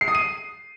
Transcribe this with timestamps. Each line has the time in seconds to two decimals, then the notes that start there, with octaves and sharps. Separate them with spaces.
0.01 C7
0.08 D#6
0.15 D#7